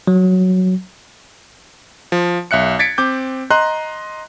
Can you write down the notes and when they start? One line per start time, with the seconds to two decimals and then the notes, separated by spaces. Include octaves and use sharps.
0.07 F#3
2.12 F3
2.51 B1 E5 F#6 C#7
2.79 G#6 A6 B6 C#7 D7
2.98 C4 D6 G6
3.51 D#5 A#5 C6 F#6